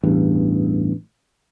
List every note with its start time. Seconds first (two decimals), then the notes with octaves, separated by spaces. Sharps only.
0.03 A1 E2 G2